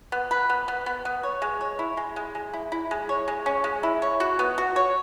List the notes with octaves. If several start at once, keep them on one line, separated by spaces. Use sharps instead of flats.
B3
B4
B3
B3
B3
B3
C#5
G#3
C#5
E4
G#3
G#3
G#3
E4
E4
G#3
C#5
G#3
C#4
G#3
E4
C#5
F#4
B3
F#4
C#5